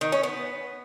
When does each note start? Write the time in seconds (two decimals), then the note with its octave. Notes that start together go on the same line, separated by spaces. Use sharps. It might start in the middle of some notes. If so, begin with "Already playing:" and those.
0.01 D#3
0.12 C#4
0.23 B3